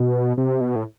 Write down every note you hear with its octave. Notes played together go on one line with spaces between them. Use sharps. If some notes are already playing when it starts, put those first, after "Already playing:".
Already playing: B2
C3
B2
A2